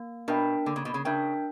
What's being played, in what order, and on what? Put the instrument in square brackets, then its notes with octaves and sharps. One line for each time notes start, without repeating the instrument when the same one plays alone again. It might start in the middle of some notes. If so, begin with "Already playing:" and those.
Already playing: [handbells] A#3
[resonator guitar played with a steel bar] B2 [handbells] D4 A#4 E5 G5
[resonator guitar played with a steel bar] D3 [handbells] A#3
[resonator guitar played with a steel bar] C#3
B2
C#3
[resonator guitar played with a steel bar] C#3 [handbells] D4 A#4 E5 G5